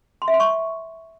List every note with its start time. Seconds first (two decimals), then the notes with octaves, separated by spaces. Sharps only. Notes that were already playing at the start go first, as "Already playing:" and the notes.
0.22 C6
0.28 E5
0.34 C6
0.40 C#6